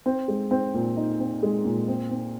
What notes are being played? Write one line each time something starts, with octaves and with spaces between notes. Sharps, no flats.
C4
G#3
C4
A#2
D#4
C4
G#3
A#2
C4
C4